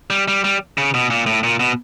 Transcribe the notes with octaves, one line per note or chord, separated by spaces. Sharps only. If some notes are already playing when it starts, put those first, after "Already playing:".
G3
G3
G3
C#3
B2
A#2
A2
A#2
B2